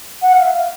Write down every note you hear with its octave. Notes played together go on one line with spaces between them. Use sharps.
F#5
F5
E5
F5